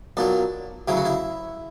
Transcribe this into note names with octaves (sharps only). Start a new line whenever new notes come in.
B1 A#2 F#3 D4
D2 C#3 F#3 E4
F#4
E4